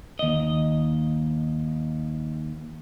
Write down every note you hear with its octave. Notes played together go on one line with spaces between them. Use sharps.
D#2 D#5